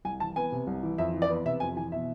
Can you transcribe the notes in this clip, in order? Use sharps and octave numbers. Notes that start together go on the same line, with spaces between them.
C2 G#5
E3 A5
B3 G#5
C3
C2
E3
F2 E5
E3
D5
B3
C3 E5
F2 G#5
E3 G#5
B2 E5